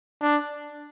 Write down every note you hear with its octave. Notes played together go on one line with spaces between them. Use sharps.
D4